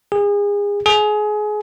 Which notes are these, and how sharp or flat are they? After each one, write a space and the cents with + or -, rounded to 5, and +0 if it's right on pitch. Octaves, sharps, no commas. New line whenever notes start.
G#4 -30
G#4 +25